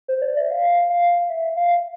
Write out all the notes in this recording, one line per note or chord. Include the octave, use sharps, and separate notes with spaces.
C5
D5
E5
F5
F5
E5
F5